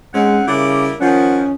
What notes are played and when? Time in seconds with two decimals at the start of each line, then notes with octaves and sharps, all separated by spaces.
0.14 G#2 G#3 C4 C#4 F#5
0.48 C#3 G3 A#3 E4 D6
1.01 D#3 F3 C#4 F#5